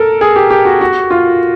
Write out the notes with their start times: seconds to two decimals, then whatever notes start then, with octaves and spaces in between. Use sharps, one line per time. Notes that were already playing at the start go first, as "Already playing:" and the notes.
Already playing: A4 A#4
0.21 G#4
0.36 G4
0.50 G4
0.65 F#4
0.81 F#4
1.11 F4